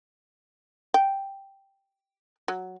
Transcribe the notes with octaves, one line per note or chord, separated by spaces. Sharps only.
G5
F#3